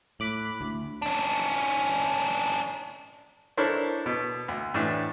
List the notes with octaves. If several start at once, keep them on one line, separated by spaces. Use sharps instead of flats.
A2 B5 D6 F#6
D2
C#4 D4
D4 E4 A4 A#4 C5 C#5
B2
D2
A2 E3 D4